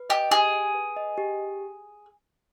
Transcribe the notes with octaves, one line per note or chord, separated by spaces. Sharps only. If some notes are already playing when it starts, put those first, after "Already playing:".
Already playing: B4
G4 D#5
G4 G#4
G#5
B4
D#5
G4